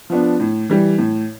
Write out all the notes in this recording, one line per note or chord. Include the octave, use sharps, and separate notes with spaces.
F3 B3 D4
A2
E3 G3
A2